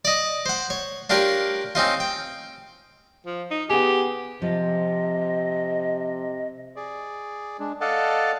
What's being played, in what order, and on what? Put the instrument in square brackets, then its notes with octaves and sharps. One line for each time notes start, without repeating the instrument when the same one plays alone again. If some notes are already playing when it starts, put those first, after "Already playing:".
[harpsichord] D5 D#5
C5 F#5
C#5
D4 F4 G4 A#4 C#5
C4 C#4 D#4 F4
G5
[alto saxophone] F3
D#4
[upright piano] B3 G#4 [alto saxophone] G4
[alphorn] C3 [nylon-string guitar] F3 [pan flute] D#5
[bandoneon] G#4 D5
G#3 D4
A4 D5 D#5 F5 F#5 A5